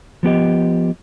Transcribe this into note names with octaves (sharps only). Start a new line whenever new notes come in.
F3 B3 G4 D#5